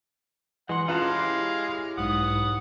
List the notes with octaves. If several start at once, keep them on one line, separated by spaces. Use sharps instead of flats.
E3 G#3 F#5 C6
G#3 C#4 D#4 F4 B4 F5 A5
E4 G4 C#5 C6 D6
B1 G#2 F#5 D#6